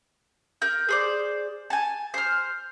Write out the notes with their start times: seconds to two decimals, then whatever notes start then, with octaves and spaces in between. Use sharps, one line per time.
0.62 A#4 G6
0.89 G#4 C5 D5
1.70 G#5 A5
2.14 C5 F6